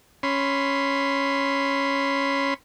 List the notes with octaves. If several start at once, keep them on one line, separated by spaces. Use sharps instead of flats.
C#4 B5 C6